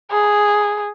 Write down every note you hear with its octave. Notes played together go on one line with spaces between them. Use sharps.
G#4